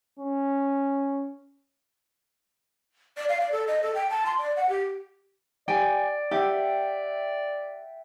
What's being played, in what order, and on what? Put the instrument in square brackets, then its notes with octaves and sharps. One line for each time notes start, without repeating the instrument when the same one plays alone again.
[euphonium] C#4
[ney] D5
F5
D5
A4
D#5
A4
G5
A5
C6
D5
F#5
G4
[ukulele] G4 G5 G#5 [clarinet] D5
[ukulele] G4 [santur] E5 F#5 G5